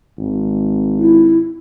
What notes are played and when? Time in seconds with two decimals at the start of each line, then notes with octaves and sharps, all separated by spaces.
0.18 G#1
0.98 E4